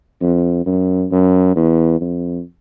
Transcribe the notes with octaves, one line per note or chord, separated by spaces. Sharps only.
F2
F#2
F#2
E2
F2